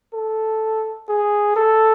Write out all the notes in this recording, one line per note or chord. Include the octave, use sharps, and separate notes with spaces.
A4
G#4
A4